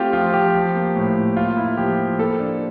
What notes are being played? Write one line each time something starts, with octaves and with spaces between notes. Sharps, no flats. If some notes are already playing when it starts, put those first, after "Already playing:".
Already playing: A3 C4 F4 G4
F3 F4
F3 G4
F3
A#3
A2
A2
A#3 F4
E4
F3 G4
F3
A#3 A4
D4